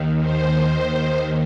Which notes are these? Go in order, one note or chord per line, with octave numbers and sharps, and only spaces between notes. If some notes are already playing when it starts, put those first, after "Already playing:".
Already playing: D#2 D#3
C5